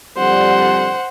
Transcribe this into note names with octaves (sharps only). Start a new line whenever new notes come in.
F2 D3 G3 C5 F#5